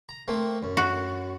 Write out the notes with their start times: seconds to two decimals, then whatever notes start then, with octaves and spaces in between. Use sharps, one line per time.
0.09 A#5
0.28 A3 A#3 C4
0.63 F#2
0.77 F#4